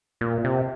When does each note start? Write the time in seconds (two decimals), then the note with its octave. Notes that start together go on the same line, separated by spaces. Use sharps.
0.21 A#2
0.45 C3